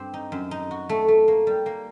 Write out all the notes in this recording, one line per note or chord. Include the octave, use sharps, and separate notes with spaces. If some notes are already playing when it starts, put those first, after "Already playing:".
Already playing: G2 C4 G4
D#4
F#2
D#4
F#4
A3
A3
A#3
G3
A#3